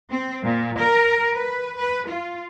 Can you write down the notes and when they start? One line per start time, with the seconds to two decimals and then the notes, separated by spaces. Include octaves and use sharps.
0.10 C4
0.44 A#2
0.78 A#4
1.34 B4
1.77 B4
2.08 F4